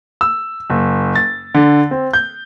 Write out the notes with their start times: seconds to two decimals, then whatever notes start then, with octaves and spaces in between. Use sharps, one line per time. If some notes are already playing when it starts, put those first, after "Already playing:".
0.21 E6
0.70 F#1
1.15 A6
1.55 D3
1.91 C4
2.13 G6